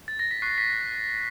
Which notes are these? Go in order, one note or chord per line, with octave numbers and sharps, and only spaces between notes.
A6
A#6
B6
C#6 F#6 C7
B6